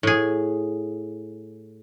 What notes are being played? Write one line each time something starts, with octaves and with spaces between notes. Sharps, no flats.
A2 G#4